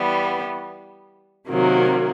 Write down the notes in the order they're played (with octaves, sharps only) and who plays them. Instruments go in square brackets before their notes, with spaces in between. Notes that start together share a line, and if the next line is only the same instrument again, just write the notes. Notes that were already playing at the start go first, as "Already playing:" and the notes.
Already playing: [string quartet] E3 G3 B3
C3 D#3 F#3 A#3